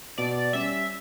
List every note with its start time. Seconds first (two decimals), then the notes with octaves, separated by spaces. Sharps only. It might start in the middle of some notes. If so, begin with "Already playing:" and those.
0.18 B2 D5
0.53 G3 C#4 E5